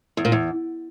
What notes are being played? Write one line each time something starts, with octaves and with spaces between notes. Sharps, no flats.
E2
A#2
E2